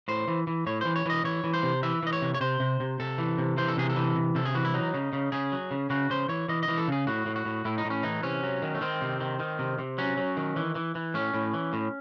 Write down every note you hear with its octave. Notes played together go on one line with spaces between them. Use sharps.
A2 C5
E3
E3
A2 C#5
E3 C5
C#5
E3 D#5
E3 C#5
E3
C5
C3
E3 E5
E3 D#5
C#5
C3
C#5
C3 C5
C3
C3
C3 A4
E3
C3
E3 C5
A4
C3 G#4
A4
E3
C3
C3 A4
G#4
E3 F#4
E4
F#3 D#4
C#3
C#3
C#3 G#4
F#3
C#3
C#3 F#4
C#3 C5
E3 C#5
E3 D#5
D#5
E3
A4
C#3 G#4
A2 F#4
A2
F#4
A2
A2 E4
D#4
A2
C#4
E3 D#4
C3 C#4
F#3
D#3
A3
D#3 C4
C3
D#3
D#3
C3
C3
F#3 C#4
F#3
D#3
E3
E3
E3
A2 C#4
A2
E3
A2